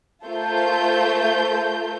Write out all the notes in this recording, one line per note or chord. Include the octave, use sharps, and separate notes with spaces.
A3 F4 A4 A#4 C5 G6